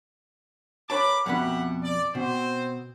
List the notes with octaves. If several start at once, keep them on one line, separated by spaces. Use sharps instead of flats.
A#4 B4 C#5 A5 B5 D6
F2 B2 G4 E5 F#5 B5
D5
B2 C4 C5